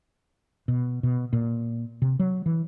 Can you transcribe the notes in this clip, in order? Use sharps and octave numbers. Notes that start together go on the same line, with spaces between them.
B2
B2
A#2
C3
F#3
E3